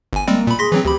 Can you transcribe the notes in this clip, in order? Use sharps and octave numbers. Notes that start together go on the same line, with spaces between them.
G1 G#5
G3 G#3 A#3 C4
A#2 B5
G#4 C6 A#6 B6
E3 F#3 C4
D2 G4 B5